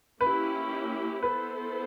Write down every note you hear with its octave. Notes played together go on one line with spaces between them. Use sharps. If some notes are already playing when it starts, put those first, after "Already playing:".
A#3 C#4 E4 G4 B4
B3 E4 A4 B4 C5